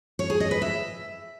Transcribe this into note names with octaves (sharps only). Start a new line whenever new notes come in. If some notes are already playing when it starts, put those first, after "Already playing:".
C#5
G#4
D#5
B4
E5